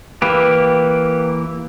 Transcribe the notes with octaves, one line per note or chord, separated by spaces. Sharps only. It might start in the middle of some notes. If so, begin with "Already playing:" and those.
E3 A#3 G4 B4